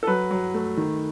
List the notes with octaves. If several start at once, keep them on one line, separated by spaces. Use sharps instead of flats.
A4
F#3 B4
F#3
A3
D#3